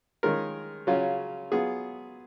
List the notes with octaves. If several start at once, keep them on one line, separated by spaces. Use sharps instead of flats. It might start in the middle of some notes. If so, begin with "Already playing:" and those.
D#3 G#3 C#4 F4 A#4
C#3 F#3 C#4 F4
F#3 B3 F4 G#4